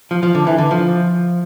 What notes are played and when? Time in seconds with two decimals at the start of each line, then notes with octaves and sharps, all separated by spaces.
0.11 F3
0.23 F3
0.35 D3
0.47 E3
0.58 D3
0.71 F3